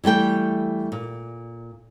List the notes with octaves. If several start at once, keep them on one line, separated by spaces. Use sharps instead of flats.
E3 G3 A3 G5
A#2